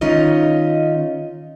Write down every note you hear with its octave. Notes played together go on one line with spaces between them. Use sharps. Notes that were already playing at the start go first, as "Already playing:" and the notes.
D#3 C#4 D#4 F4 D#5